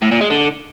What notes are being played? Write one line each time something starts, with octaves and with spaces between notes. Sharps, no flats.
A2
A#2
G#3
D3